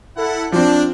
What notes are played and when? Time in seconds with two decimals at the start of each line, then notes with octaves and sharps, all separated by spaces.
0.17 E4 A4 F#5
0.52 F3 C4 D4